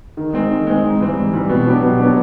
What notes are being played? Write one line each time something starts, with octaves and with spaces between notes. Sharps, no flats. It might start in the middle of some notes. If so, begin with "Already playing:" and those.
D#3
G#3 C4
D#3
G#3 C4
G#2
E3 G3 C4
G#2
E3 G3 C4
B2
F#3 B3 D4 G4
B2
F#3 B3 D4 G4